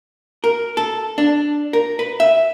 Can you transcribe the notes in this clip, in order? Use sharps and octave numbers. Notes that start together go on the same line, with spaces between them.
A#4
A4
D4
A#4
B4
E5